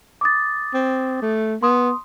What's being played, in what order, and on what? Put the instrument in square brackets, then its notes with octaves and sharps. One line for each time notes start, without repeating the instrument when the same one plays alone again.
[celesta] D6 D#6 A6
[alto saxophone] C4
A3
[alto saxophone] B3 [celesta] C6 D#6